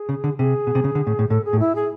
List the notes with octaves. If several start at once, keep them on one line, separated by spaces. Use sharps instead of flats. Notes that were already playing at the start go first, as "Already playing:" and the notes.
Already playing: G#4
C#3
D3
C3 G#4
B2
C3
C#3
D3
A2
A2
A2 A4
G#4
A2
E4
G#4